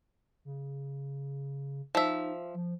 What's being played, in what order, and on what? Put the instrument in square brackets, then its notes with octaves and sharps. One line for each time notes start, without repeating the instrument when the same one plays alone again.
[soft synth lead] C#3
[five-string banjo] F3 E5 [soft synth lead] D#4
[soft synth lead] F3